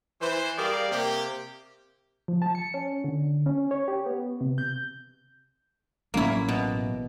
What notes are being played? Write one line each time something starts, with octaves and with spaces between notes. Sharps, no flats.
E3 C5
G3 G4 G#4 A#4 D5 F5
C3 A#3 G4
F3
A5
C#7
C#4
D3
C#4
C#5
G4
B3
C3
G6
A1 F#3 A#3 C#4 E4
B2